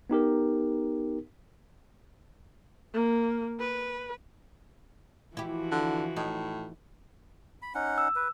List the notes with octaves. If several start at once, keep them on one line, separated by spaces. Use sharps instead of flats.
B3 D#4 G4 A#4
A#3
B4
E3 F3 E4 F#4 G4
D3
A2 D#4
B5
C#4 D#4 F#5
E6
B4